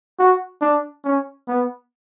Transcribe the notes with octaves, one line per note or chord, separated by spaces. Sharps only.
F#4
D4
C#4
B3